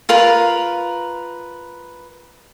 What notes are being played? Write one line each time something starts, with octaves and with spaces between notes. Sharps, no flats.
F4 A#4 B4